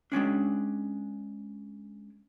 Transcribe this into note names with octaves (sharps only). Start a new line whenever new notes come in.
G#3 A#3 C#4 D4